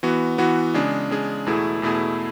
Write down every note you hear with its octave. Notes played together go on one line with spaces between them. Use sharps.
E3 B3 F#4
E3 B3 F#4
C#3 G#3 D4 G#4
C#3 G#3 D4 G#4
E2 B2 A3 E4 G#4
E2 B2 A3 E4 G#4